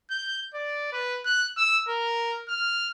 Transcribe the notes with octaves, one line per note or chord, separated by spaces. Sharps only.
G6
D5
B4
F#6
E6
A#4
F6